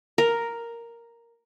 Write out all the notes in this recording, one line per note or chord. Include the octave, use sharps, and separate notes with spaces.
A#4